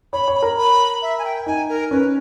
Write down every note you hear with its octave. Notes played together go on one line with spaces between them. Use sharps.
C#5 B5
C#5
B5
A#4
B5
E5
G#5
G5
D#4 G#5
A#4
C#4 B4